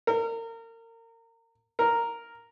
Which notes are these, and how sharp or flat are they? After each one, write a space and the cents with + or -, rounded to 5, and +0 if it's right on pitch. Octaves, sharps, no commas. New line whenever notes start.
A#4 -30
A#4 -5